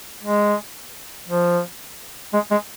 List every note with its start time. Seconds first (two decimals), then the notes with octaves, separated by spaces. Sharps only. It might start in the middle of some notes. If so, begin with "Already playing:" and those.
0.23 G#3
1.28 F3
2.33 G#3
2.51 G#3